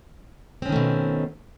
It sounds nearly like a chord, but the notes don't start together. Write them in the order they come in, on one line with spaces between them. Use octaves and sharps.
C4 C#4 D#3 A3 B2